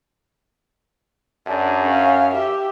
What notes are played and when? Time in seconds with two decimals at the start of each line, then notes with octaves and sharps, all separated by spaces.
1.47 F#2 D4 G#4
1.85 C#4 F5
2.34 G4 E5